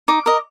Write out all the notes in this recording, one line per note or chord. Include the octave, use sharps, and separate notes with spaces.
D#4 D6
A#4 D#5